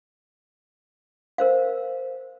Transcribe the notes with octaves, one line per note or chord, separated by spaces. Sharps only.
A#4 C5 F5